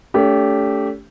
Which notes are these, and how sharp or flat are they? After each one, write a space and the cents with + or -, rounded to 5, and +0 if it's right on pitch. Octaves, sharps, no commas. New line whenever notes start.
A3 +0 C#4 +45 G4 +0